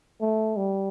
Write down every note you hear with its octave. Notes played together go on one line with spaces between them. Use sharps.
A3
G3